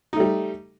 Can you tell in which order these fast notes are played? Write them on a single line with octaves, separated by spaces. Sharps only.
D#4 A3 G3